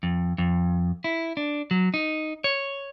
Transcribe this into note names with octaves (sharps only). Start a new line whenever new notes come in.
F2
F2
E4
D4
F#3
D#4
C#5